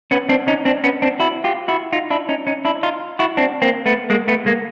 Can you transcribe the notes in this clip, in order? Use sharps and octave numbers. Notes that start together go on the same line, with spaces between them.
B3 C#4
C4 D4
C#4 D#4
C4 D4
B3 C#4
C4 D4
E4 F#4
F4 G4
E4 F#4
D#4 F4
D4 E4
C#4 D#4
C#4 D#4
D4 E4
D#4 F4
E4 F#4
C4 D4
A#3 C4
A3 B3
G#3 A#3
A3 B3
G#3 A#3